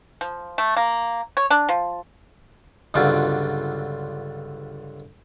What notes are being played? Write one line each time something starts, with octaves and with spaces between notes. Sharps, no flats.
F3
A3
A#3
C#5
D4
F3
C#2 G2 D3 F#3 C4 F4